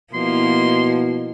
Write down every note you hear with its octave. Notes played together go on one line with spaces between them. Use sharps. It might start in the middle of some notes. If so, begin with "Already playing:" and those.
B2 F3 A#3 E4 C6